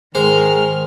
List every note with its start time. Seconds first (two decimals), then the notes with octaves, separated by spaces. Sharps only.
0.15 G#2 D#3 G#3 C5 F6